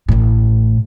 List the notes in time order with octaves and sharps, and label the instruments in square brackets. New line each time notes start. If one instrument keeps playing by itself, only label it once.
[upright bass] A1 A2